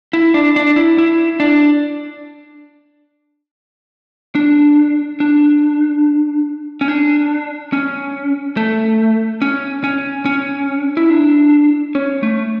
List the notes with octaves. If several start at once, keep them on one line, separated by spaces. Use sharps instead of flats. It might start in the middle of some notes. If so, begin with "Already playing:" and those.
E4
D4
D4
E4
E4
D4
D4
D4
C#4
D4
C#4
A3
C#4
C#4
C#4
E4
D4
C#4
A3